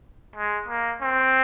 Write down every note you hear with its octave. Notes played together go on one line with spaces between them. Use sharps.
G#3
A#3
C4